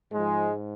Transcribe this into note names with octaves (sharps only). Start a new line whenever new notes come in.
G#2 F3 G#3